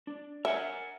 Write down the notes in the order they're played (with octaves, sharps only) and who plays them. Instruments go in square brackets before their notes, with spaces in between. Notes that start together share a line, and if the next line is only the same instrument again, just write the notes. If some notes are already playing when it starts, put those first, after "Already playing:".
[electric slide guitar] D4
[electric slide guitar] A#4 F#5 G#5 [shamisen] E5